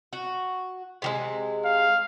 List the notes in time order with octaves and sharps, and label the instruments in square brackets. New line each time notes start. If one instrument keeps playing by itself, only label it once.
[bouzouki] F#4
C3 F#3 G#3
[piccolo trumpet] F5